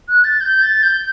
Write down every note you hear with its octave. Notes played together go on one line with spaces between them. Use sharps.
F#6
A6
G6
A6
G6